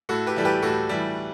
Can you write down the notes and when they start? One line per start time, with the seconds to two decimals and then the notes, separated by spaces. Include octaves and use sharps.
0.09 A2 F#4 A4
0.26 G4 B4
0.36 E3 G3 A4
0.45 G4 B4
0.62 A2 F#4 A4
0.89 E3 G3